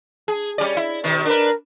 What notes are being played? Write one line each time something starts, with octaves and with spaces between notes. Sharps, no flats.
G#4
G3 C#4 D5
E4
B2 D#3
D4 A#4 B4